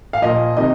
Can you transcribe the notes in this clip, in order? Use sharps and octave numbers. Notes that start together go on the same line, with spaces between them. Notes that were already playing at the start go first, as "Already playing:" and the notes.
F5
A#2 F3 D#5
C3 D#3 D#5